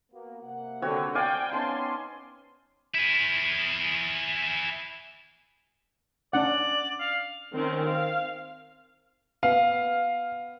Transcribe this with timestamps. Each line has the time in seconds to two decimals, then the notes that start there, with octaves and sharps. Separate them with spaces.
0.12 A#3 B3 F#4
0.43 C3 A#3 F#5
0.82 D3 C4 F#4 C#5
1.15 D5 F5 G5 G#5
1.53 B3 C#4 D#4 G#5 A5 C6
2.95 E4 G#4
6.33 C#4 D4 D5 F#5
7.00 F5
7.52 D#3 C4 C#4
7.87 F5
9.43 B3 F5